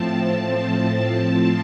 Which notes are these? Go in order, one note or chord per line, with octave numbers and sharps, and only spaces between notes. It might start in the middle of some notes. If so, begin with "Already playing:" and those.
Already playing: A2 F3 C4 A5